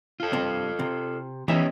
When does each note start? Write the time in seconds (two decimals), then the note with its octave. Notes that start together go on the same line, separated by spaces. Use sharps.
0.20 F4 A4
0.33 G2 C3 C4
0.79 C3
1.48 E3 B3 C#4 D#4 G4 E5